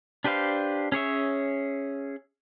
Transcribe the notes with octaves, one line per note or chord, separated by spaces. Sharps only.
D4 G4 B4 C5 F5
C#4 G#4 C#5 E5